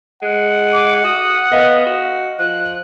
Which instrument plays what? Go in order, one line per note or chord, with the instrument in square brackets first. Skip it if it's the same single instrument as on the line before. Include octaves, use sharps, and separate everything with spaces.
[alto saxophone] G#3 [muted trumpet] F#5
[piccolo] D6
[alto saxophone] F#4 [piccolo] D#6
[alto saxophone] B3 [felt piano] D#5 F5
[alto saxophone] F#4
[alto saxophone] F3 [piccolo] F#6